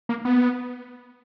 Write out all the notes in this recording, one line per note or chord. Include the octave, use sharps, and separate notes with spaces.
A#3
B3